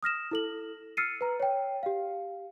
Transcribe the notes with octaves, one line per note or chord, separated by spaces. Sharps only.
D#6 F6 A#6 E7
E4 A4 F#7
E6 F6 A6 C7 C#7 D#7
B4 A#5
C#5 G5
G4 F5